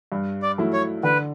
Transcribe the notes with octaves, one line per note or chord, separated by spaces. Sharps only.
G2
D5
F#3 A3 E4
C#5
D3 B4